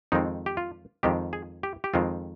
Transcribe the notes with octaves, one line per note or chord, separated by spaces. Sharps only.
F2 D#3 G#3 C4 D#4
G4
F4
F2 D#3 G#3 C4 G4
G#4
G4
G4
F2 D#3 G#3 C4 F4